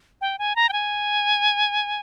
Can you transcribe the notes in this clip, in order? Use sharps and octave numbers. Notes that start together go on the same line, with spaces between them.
G5
G#5
A#5
G5
G#5